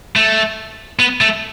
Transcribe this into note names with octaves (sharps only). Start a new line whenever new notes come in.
A3
B3
A3